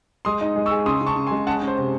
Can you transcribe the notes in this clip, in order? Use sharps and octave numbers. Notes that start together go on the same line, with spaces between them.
G#3 C6 D#6
D#4
G#3
C#6 E6
G#4
C#3 C6 D#6
C#3
A5 C#6
C#3
G#5 C6
G#3
C#4 F#5 A5
C#4
C5
C3